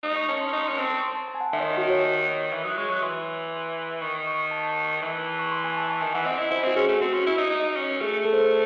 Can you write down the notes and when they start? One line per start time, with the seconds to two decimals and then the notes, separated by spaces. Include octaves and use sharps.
0.03 D#4 D#6
0.16 C#6
0.28 C#4 A5
0.41 C6
0.48 C#4
0.53 D#4 C#6
0.65 C#4 C6
0.78 C4 A5
0.90 C#6
1.03 C6
1.15 A5
1.28 A5
1.35 G#5
1.41 F#5
1.53 D#3 E5
1.60 C#5
1.65 D#5
1.78 F#4
1.90 C#5
2.52 E3 E5
2.64 F#3 D#6
2.77 G#3 C#6
2.89 F#3 C#6
3.02 E3 C6
4.01 D#3 C#6
4.27 C#6
4.51 A5
5.02 E3
5.39 C#6
5.51 C6
5.64 G#5
5.77 A5
5.89 A5
6.01 D#3 G#5
6.14 E3 F#5
6.26 C4 D#5
6.38 E4 D#5
6.51 E4 C5
6.64 C4 F#4
6.76 C#4 G#4
6.88 A3
7.01 C4 F#4
7.13 C#4
7.26 E4
7.38 D#4
7.50 D#4
7.76 C#4
8.01 A3 G#4
8.25 A4
8.33 C5
8.41 A4